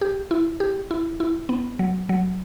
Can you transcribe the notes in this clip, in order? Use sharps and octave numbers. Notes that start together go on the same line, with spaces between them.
G4
E4
G4
E4
E4
B3
F#3
F#3